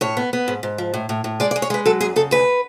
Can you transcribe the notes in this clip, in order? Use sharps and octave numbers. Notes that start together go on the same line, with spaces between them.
A2 C#5
B3
B3
G#2
G#2
F3
A2
A2
A2
G#3 D5
D5
G#3
C#5
G#3 B4
F#3 A4
F#2 G#4
C#3 A4
D2 B4